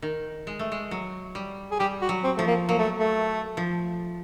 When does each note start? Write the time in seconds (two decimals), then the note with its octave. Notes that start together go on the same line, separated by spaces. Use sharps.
0.02 D#3
0.47 G#3
0.59 A3
0.72 G#3
0.91 F#3
1.35 G3
1.71 G#4
1.79 G3 G4
2.02 F#4
2.09 F#3
2.24 C4
2.37 F3 A3
2.47 A#3
2.69 F#3 A#3
2.78 A3
2.99 A3
3.57 F3